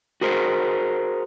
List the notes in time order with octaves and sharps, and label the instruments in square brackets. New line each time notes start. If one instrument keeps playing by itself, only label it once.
[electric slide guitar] F#4 G#4 A#4 C5